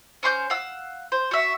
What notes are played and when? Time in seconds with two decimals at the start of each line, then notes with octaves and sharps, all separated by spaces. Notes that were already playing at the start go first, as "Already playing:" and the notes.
0.23 C#4 C5 C6 G6
0.50 F5 F#5 E6
1.12 C5
1.31 F#4 E5